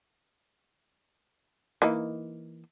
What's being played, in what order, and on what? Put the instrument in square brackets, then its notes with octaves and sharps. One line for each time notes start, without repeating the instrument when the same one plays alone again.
[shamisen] E3 A#3 D#4